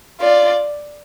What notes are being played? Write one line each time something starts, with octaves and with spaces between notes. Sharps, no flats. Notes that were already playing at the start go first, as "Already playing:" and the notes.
F4 D5